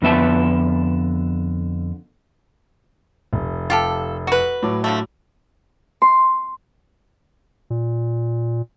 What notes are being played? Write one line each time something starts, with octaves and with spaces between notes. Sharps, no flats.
F2 D3 B3 E5 A5
F1
F4 G4 A4
F#4 B4
A2 F#3 D6
D3 F3 A3
C6
A#2